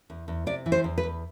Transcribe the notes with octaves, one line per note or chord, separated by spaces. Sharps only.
E2
E2
C3 D5
E3
C5
E2
B4
E2